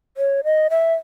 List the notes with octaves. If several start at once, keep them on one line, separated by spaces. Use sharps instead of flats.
C#5
D#5
E5